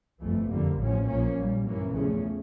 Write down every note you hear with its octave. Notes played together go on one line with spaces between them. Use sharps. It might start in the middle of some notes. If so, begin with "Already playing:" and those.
G1 F2 E3 A3
F2 D3 G3 A#3
A1 A2 F3 C#4
A#1 A#2 F3 A#3 C#4
A#1 A#2 G3
G2 E3 A#3 C#4
E2 C#3 F3 A3 C#4